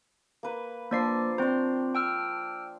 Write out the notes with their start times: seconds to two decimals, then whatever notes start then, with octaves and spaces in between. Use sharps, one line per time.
0.43 A#3 B4
0.91 F3 A#3 D4 D5 D6 C7
1.38 C4 C5 D5 C6
1.95 G5 E6 F6